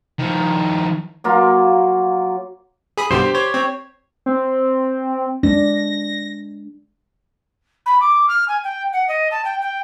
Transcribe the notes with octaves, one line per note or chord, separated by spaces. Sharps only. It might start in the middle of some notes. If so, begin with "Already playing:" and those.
D#3 F3
F#3 A#3 F4
G#4 B5 D#6
G2 B2 D3 G4 C5 C7
C5 C#5
C4
C4
G#3 D4 A#6
B5
D6
F6
G#5
G5
F#5
D#5
A5
G5
G5